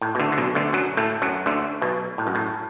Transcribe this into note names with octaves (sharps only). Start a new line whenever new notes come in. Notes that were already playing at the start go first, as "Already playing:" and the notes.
A2
B2
D2 D3
D3
B1 B2
D2 D3
F#2 F#3
A2 A3
F#2 F#3
D2 D3
B1 B2
A2
F#2
A2